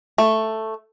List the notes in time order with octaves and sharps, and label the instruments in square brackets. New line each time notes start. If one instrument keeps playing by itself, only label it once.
[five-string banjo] A3